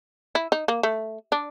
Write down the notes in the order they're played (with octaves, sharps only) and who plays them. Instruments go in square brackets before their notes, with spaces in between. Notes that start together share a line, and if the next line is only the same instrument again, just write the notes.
[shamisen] E4
D#4
A#3
A3
D4